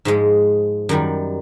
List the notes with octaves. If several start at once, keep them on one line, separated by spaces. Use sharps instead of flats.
G#2 F3 G#3
F#2 D#3 G3